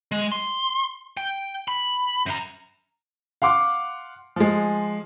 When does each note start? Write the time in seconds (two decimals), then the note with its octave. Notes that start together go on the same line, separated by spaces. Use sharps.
0.12 G#3
0.32 C6
1.17 G5
1.68 B5
2.26 F#2 A#5
3.42 F5 F#5 C6 D6
4.36 F3 G#3